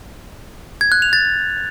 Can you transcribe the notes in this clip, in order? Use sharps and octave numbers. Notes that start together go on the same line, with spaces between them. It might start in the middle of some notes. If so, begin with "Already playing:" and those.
G#6
F#6
F7
A6